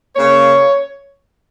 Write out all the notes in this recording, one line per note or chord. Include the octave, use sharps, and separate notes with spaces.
C#3 A#3 C#5